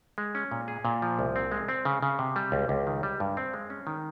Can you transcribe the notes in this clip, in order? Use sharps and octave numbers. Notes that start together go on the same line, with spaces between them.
G#3
C#4
A#2
G#4
A#2
F3
C2
C4
G#3
C4
C#3
C#3
C3
G3
C#2
C#2
D#3
G3
G2
C4
G#3
C#4
D#3